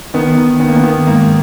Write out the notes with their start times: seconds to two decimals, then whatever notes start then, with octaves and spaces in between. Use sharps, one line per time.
0.14 D#3 B3
0.37 D#3
0.60 D#3 B3
0.68 A#3
0.76 B3
0.83 D#3
1.07 G#2 A#3